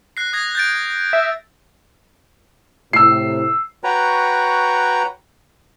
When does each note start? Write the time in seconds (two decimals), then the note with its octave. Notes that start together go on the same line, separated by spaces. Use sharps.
0.17 F#6 A#6 C7
0.33 D#6 G#6 A#6
0.55 G6 A6 D7
1.13 E5
2.93 A2 C3 E6 C7
3.84 F#4 B4 C#5 G5 A#5